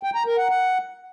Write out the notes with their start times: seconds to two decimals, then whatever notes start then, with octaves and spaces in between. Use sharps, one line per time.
0.03 G5
0.15 A#5
0.26 A#4
0.38 F#5
0.49 F#5